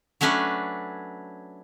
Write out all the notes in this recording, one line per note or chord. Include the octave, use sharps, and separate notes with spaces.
F#3 A3 C#4 D4 B4